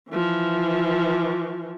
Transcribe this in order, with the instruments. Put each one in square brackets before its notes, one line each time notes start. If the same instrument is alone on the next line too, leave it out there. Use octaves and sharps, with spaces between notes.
[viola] E3 F3